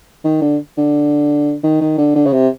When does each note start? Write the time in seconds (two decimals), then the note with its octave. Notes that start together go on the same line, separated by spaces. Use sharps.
0.25 D#3
0.42 D3
0.78 D3
1.64 D#3
1.81 D#3
1.98 D3
2.16 D3
2.26 C#3
2.33 C3